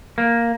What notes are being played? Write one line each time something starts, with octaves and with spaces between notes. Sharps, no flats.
A#3